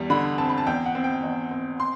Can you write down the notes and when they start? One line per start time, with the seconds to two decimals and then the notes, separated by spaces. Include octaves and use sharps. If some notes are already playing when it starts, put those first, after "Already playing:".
Already playing: E2 G3
0.10 D3 B5
0.38 C4 A5
0.49 B5
0.58 A5
0.67 E2 G5
0.86 F#5
0.95 C4
1.04 G5
1.23 E2
1.51 C4
1.80 C6